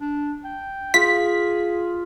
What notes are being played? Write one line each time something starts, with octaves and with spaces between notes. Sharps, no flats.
D4
G5
F4 G#4 B6